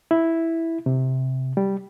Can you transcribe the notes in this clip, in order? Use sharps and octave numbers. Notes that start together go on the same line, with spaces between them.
E4
C3
G3